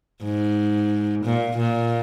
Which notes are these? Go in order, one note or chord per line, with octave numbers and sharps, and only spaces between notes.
G#2
A#2
A#2